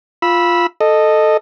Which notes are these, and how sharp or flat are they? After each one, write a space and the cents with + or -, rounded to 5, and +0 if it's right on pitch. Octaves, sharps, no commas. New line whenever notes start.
F4 +0 B5 -15 E6 +0
A4 +0 D#5 -10